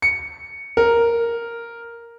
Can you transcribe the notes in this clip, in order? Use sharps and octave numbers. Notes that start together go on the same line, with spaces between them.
C#7
A#4